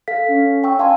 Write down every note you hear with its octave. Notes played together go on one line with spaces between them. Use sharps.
A4 F5 B6
C#4
G5 C#6 E6
F5 G#5 A5 C6